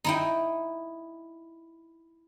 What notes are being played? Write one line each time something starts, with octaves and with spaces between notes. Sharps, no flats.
D#4 E4 G5